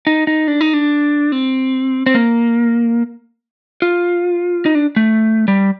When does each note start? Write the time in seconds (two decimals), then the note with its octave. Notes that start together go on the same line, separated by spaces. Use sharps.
0.07 D#4
0.27 D#4
0.48 D4
0.61 D#4
0.74 D4
1.32 C4
2.06 C4
2.15 A#3
3.82 F4
4.66 D#4
4.75 D4
4.96 A3
5.48 G3